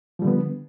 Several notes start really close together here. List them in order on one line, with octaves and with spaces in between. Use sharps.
F3 G3 D3 B3